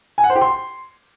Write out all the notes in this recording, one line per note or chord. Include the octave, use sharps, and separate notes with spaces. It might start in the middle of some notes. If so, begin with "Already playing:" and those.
G#5
F#5
C5
G4
C6